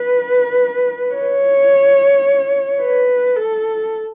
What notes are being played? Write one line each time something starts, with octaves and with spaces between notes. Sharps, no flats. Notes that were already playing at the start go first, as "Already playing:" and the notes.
Already playing: B4
C#5
B4
A4